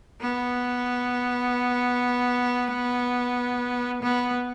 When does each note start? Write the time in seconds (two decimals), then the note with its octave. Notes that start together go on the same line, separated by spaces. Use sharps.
0.21 B3
4.02 B3